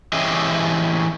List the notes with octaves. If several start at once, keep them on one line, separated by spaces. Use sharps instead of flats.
E3 C#4 G4 G#4 D#5 E5